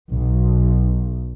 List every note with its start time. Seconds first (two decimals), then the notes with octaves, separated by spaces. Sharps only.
0.13 B1